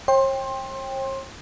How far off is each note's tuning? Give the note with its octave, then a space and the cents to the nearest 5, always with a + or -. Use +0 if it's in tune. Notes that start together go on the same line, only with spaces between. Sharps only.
C#5 -45 G5 +15 C6 +20